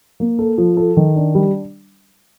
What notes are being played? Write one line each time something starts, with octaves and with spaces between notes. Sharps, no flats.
A#3
A4
F3
A4
D#3
D4
G3